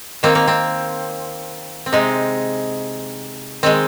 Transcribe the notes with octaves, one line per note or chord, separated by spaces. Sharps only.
D#3 A#3 C4
A#3
C4
C4
C3 G#3 D#4
D#3 G#3 C4